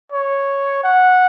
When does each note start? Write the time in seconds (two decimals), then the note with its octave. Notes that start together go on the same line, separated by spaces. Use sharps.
0.12 C#5
0.83 F#5